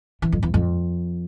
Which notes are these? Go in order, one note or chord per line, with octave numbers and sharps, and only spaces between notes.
E3
F2
E2
F2